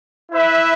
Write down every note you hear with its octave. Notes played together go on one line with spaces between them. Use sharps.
E4 B4 E5